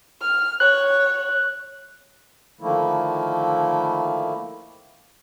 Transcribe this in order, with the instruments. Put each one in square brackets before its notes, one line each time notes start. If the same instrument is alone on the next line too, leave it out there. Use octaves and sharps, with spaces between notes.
[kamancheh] F6
[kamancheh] C#5 [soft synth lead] F#6
[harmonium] D3 D#3 F3 A3 A#3 E4